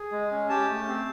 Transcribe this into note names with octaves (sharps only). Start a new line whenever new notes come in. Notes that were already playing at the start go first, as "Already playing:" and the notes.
Already playing: G#4
G#3
C#4
G4 A5
A3
C4